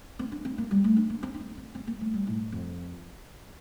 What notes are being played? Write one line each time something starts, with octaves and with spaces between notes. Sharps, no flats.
C4
D4
C4
A#3
G3
A3
D4
A#3
C4
D4
C4
C4
C4
A#3
A3
G3
A2
F2